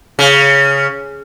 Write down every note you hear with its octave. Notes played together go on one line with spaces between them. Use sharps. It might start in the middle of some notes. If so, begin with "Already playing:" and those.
C#3